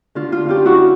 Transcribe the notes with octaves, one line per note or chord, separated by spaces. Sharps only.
D3 F4
F4
F#2 F4 G4
E4 F#4